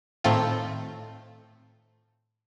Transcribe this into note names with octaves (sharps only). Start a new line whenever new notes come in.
A2 D#3 A3 C4 F4